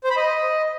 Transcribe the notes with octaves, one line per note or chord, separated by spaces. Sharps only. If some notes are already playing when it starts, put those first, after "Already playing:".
C5
B5
D#5